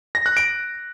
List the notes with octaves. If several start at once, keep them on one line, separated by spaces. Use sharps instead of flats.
A#6
F#6
D7